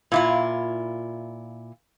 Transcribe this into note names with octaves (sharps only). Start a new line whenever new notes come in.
A#2 E4 F4